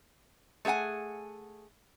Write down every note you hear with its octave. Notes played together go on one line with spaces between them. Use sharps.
A3 G#4 B4 F#5 G#5